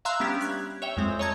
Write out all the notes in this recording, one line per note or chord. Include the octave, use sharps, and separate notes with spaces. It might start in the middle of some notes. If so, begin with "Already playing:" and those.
E5 F5 A#5 C6 E6 F#6
G3 B3 C#4 D4 G4
F#6 G#6
C#5 E5 G5
F2 G#3 C4
C#5 D#5 A5 A#5 G#6